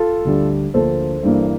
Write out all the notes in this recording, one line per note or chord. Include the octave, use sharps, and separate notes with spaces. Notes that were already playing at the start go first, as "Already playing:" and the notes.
Already playing: F4 A4
D2 D3 G3
D2 D3 F3 A#3 A4 C5
G2 E3 A#3